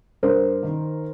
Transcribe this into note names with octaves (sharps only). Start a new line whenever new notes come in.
G2 A#4 C5
D#3